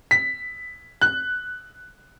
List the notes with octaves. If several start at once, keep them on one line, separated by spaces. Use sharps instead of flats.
B6
F#6